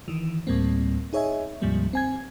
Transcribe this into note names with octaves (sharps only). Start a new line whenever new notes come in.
D#3 E3
D2 A2 G3 A#3 C4
D#4 G#4 C#5 D#5 E5 G#5
D2 G#2 C3 F3 G3 A#3
C4 G#5 G#6